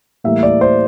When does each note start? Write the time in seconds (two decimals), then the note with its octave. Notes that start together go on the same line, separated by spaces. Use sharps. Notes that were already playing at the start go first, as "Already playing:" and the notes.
0.24 A2 E3 G3 A#3 E5
0.43 D5
0.61 C5